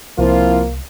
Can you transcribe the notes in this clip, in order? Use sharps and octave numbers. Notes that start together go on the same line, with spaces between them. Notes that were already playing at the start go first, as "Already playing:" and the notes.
C2 F3 A#3 C4 E4 F4